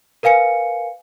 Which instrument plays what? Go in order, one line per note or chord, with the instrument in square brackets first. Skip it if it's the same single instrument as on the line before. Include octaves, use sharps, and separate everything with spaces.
[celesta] A#4 B4 F5 G#5 C#7